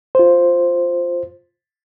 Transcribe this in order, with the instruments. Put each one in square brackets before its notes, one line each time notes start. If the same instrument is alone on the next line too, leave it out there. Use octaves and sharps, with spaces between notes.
[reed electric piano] F4 C5